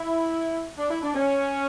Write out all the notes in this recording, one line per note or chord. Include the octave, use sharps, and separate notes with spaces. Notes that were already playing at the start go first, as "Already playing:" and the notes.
Already playing: E4
D4
E4
D4
C#4